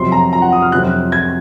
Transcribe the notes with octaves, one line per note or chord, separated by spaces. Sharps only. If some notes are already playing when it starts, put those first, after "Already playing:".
Already playing: F2 C3 F#3 C4 C6
A#5
A#5
F#5
D#6
F6
F2 C3 F#3 C4 F#6
G#6